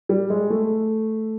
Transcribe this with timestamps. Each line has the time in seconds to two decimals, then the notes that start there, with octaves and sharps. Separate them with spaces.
0.09 G3
0.30 G#3
0.50 A3